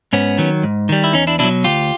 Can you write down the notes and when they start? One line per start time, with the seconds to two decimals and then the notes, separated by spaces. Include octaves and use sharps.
0.13 G#2 B3 C#4
0.38 D#3 F#3
0.63 G#2
0.89 D#3 G3
1.04 E4
1.13 E2 C#4 D#4
1.27 D4 E4
1.39 B2 D4 E4
1.44 F#3
1.64 D2 F4 G4